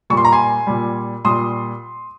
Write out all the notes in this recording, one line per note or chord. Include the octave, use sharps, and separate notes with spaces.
A#2 G3 C#6
C6
A#5
G#5 C6
A#2 G3
A#2 G3 C6 D#6